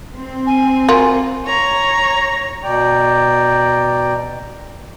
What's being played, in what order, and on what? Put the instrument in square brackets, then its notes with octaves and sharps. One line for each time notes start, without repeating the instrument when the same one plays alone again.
[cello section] C4
[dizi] G#5
[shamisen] A#3 F4 F#4
[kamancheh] C#5 A#5
[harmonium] B2 D5 G5 A#5